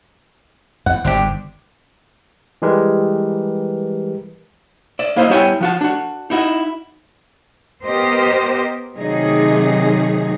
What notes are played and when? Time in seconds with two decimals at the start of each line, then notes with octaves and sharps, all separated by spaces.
0.86 E2 F#5
1.05 G1 G#2 C4 D4 G4
2.62 E3 G3 G#3 G4 A#4 B4
4.99 D5 E5
5.16 A#3 E4 C5 D#5 F5
5.30 G3 B3 E4 C#5 G5 G#5
5.61 F3 F#4 A5
5.81 D4 F#4
6.30 D#4 E4 F#4
7.85 B3 G4 A#4 C5 D#5
8.97 C3 D#3 F#3 A3 D#4 G#4